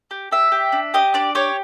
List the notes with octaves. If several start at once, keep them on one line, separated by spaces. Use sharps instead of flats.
G4
G4 E5
G4
D4
G4 D#5
D4 D5
G4 C#5